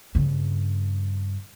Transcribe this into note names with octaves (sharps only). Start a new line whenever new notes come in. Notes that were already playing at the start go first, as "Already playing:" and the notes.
G2 C#3